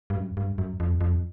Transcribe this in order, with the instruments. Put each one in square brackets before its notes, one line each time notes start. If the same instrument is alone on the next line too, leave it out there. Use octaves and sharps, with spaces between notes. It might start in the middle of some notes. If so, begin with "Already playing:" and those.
[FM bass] G2
F#2
G2
F#2
F2
F2